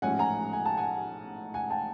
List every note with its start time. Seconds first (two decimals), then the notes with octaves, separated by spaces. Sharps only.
0.02 A1 G#2 F3 A3 C#4 F#5 G#5
0.19 G#5 A#5
0.53 G#5
0.66 A5
0.77 F#5 G#5
1.54 F#5 G#5
1.70 G5 A5